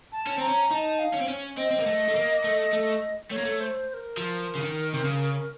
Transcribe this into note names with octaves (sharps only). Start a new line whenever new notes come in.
A5
C#4
C4 A#5
C#4
D#4 A5 A#5
F5
C#4
C4
C#4
C4 D#5
C4
A#3
A3
A3
A#3
A3
A3
A3 C#5
A#3
A3
C5
C5
A#4
F3
C#3
D#3
C3
C#3